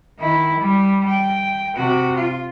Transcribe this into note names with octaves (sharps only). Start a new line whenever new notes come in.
D#3 E4
G3
G5
C3 F#4
F4